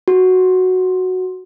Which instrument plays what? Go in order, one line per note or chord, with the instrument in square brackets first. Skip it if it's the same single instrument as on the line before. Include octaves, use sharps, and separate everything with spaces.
[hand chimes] F#4